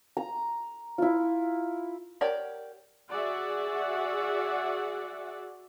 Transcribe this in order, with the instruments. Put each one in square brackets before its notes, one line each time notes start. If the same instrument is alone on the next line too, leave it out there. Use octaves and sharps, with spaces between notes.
[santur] A#5
E4 F4
[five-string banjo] G4 A#4 C#5 D5 F#5
[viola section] F#4 G#4 D5 E5 F#5